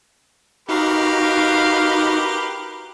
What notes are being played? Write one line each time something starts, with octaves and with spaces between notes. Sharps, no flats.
D#4 F#4 G4 A#4 B4 F5